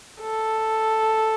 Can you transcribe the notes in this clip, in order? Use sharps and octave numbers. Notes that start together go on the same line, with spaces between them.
A4